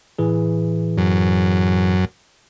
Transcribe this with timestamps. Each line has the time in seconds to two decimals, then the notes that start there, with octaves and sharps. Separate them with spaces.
0.18 A2 E3 G#4
0.98 F#2